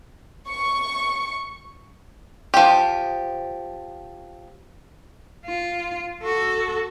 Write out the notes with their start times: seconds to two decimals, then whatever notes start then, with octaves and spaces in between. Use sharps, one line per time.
0.49 C#6
2.54 F3 G4
5.46 F4
6.23 F#4 A4